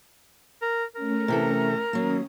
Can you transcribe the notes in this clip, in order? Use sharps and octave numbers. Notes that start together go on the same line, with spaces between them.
A#4
A3 C#4 A#4
C3 E3 A4
D#3 F#3 A#3 C#4 D#6